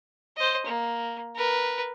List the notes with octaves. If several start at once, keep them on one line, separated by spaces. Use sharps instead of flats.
C5 D#5
A#3
A#4 B4